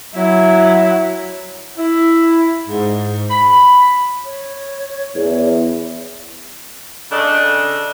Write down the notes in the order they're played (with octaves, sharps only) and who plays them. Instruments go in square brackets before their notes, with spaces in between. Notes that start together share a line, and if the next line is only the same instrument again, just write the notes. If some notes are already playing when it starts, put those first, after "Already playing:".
[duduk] F#3 [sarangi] E4
[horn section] E4
G#2
B5
[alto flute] C#5
[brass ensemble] E2
[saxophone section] C#3 D4 A4 D#5